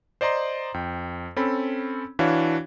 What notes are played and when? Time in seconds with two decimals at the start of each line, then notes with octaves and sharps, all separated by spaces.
0.21 C5 D5 D#5 A#5 C6
0.74 F2 G5
1.36 C4 C#4 A4 B5
2.19 E3 D4 E4 F#4 C#5 F5